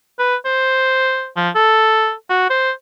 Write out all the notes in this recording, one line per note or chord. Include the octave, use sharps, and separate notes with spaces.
B4
C5
F3
A4
F#4
C5